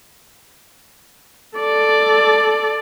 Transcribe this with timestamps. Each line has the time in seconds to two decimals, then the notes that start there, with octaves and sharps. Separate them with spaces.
1.58 A4 D5